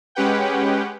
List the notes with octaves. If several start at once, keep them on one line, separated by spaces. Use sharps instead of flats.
G#3 C#4 G4 B4 F#5 G5